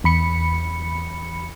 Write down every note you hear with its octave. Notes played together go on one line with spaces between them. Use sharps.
E2 B5 C#7